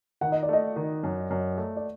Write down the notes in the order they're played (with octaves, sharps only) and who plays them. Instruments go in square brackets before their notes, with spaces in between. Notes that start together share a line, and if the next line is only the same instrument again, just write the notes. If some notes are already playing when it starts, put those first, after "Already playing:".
[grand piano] D#3 [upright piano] F#5
[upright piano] D#5
D5
[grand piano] A3 [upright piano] D#5
[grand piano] D#3
F#2
F#2
A3
[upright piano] D5